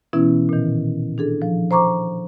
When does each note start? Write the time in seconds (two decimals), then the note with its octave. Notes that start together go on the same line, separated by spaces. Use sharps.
0.13 B2 E3 B3 C#4 E4
0.49 A#2 D#3
1.18 D4 G#4 A4
1.42 F3
1.71 C5 A#5 C#6 D6